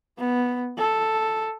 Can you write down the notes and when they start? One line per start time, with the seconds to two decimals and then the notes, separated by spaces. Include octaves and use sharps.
0.18 B3
0.78 A4